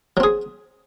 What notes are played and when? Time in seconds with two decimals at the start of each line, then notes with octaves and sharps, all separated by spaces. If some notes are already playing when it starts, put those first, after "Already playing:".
0.17 F#3
0.20 C4
0.23 G#4